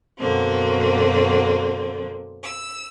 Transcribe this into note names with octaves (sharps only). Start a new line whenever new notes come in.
F#2 B2 D3 A#3 C4
E6